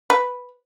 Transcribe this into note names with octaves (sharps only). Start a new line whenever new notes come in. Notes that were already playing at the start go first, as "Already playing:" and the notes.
B4